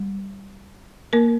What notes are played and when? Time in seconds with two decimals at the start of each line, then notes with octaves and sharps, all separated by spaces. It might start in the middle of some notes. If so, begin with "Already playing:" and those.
Already playing: G3
1.13 A#3 A#4